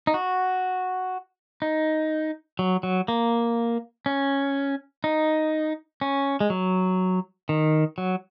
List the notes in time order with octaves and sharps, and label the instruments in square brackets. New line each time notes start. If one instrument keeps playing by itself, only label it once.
[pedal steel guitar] D#4
F#4
D#4
F#3
F#3
A#3
C#4
D#4
C#4
G#3
F#3
D#3
F#3